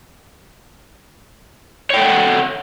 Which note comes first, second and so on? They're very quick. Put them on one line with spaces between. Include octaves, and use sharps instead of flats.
C#5 G5 A4 F#5